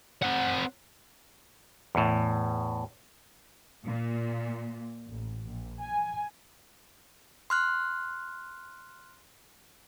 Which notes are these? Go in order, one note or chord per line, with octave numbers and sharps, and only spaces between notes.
C4 F#5
E2 A2
A#2
A1
A#1
G#5
C6 F6 F#6